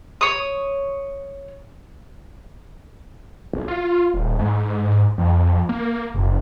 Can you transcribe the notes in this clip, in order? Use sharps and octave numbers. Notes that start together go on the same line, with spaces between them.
C#5 D#6
B1
F4
D#1
G#2
F2
A#3
F#1